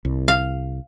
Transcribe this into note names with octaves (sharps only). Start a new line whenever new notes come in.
C2
F5